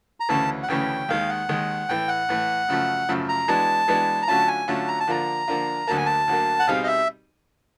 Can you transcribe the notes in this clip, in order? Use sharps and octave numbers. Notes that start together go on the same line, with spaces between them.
A#5
D2 C#3 E3 A3 C#4 A5
F#5
D2 C#3 E3 A3 C#4 G5
D#2 D#3 G#3 F5
F#5
D#2 D#3 G#3
A2 E3 A3 G5
F#5
A2 E3 A3
F#2 C#3 F3 A3
F#2 C#3 F3 A3
A#5
E3 G#3 B3 D4 F#4 A5
E3 G#3 B3 D4 F#4
A#5
D3 F#3 A3 C#4 F4 A5
G#5
D3 F#3 A3 C#4 F4 A5
A#5
A5
D3 F3 A#3 D4 F4 A#5
D3 F3 A#3 D4 F4
D2 D3 F#3 A#3 A5
G#5
A5
D2 D3 F#3 A#3
F#5
B2 G3 C4 D#4 G#4 F5
D#5
E5